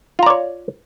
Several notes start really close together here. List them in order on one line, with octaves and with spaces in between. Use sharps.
F4 A#5 D5 C#5